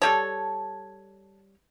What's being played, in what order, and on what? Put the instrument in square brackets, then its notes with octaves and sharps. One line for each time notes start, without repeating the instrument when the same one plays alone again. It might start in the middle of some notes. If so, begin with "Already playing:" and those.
[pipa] G3 C#5 [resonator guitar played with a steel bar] A4 A5